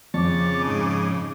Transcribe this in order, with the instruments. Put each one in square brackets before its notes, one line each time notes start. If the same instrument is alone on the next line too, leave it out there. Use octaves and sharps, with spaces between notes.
[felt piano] F2 [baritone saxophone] C#3 [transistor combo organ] C#5 A5 [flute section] D6
[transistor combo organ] G#2 D#4